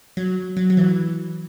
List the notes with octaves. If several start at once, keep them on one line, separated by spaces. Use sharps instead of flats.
F#3
F#3
F#3
E3